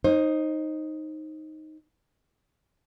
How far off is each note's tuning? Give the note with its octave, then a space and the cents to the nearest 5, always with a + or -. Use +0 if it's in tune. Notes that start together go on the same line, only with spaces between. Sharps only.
D#4 +0 C5 +25